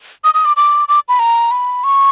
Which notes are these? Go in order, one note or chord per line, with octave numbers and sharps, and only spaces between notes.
D#6
D#6
D6
D6
D6
B5
A#5
B5
C#6